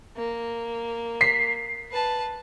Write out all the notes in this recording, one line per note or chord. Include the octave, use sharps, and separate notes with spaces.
A#3
B6 C7
B4 A5